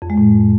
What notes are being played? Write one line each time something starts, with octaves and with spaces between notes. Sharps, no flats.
F2
G#3
A2